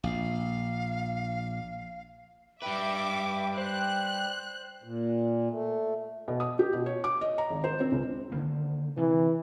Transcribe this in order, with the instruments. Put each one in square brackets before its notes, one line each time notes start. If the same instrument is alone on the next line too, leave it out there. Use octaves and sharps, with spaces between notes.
[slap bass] A#1 [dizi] F5
[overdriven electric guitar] G3 B4 [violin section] E5 D6 [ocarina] G5
[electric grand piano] C5 [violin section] F#6
[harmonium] A#2
A3
[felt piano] B2
D#6
G4
B2
C#5
D6
D#5
A#5
G#1
C5
C4
C#2
[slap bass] D3 D#3 A#3
[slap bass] C3 [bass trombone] E3